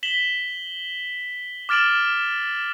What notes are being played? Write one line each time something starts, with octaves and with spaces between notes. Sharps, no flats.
B6 E7 F#7 G7
D6 F6 A6 D7 E7 F#7